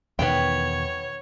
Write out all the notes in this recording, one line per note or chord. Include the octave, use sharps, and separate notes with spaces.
E2 B2 D#3 B3 C#5 G5